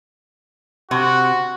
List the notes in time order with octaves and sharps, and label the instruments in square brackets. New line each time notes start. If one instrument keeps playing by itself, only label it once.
[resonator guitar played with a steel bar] C3 [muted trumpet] F#4